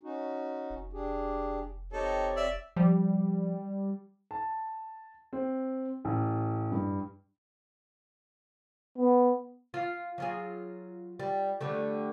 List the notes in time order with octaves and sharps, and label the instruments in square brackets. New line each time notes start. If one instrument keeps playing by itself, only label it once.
[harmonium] C#4 D#4 F#4
[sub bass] F1
[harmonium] D4 G4 G#4
[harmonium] C4 G4 C#5 [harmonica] D#4 A4
[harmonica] D5 E5
[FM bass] F3 [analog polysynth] G3
[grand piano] A5
C4
A1
G2
[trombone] B3
[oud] F4
F#3 F4 G#4
G3
D3 G3 A3